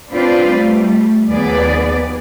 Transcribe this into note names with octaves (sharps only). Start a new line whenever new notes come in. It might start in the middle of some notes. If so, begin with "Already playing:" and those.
C4 D4 F4 B4 C5 D5
G3 A3
D#2 F3 B3 G#4 B4 D5